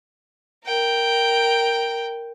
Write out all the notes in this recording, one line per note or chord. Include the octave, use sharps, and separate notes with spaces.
A#4 G5